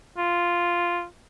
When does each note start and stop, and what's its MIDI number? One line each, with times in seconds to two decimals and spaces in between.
0.17 1.05 65